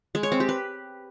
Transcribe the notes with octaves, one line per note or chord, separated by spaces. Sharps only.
G#3
C#5
C4
G4
B4